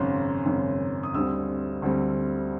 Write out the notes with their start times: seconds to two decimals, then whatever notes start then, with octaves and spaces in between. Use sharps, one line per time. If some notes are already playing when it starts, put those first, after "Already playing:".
Already playing: G#1 F#2 C#3 C6
0.46 G#1 F#2 C#3
1.03 D#6
1.14 D2 D3 G3 C4 E6
1.82 D2 D3 G3 C4